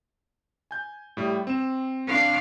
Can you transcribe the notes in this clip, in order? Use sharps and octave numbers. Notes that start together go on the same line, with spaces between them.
G#5 G6
A2 G3
C4 E7
D4 F5